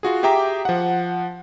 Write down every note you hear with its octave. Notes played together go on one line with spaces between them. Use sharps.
F4 F#4 G#4
G4 G#4 E5 G5 A#5 D6
F3 F#5